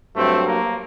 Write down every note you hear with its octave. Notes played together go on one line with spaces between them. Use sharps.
G2 F#3 A3 C4
A#3